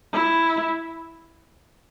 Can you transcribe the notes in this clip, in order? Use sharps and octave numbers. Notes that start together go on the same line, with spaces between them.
E4